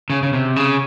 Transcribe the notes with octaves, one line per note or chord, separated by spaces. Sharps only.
C#3
C#3
C3
C#3